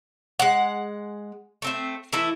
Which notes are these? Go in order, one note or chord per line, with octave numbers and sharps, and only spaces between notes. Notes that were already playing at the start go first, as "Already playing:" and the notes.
G#3 F#5
A3 C4 E5
E3 A3 E4 E5